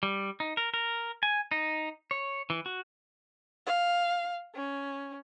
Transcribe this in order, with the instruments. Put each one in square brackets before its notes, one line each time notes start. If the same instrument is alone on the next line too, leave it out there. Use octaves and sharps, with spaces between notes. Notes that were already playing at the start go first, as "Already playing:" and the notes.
[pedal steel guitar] G3
D#4
A#4
A#4
G#5
D#4
C#5
E3
F#4
[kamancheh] F5
C#4